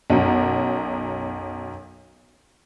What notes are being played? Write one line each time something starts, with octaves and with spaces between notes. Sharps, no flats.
B1 F#2